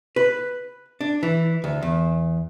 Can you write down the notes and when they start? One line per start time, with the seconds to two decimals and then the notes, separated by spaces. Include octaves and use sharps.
0.16 B4
1.01 D4
1.23 E3
1.64 D2
1.82 E2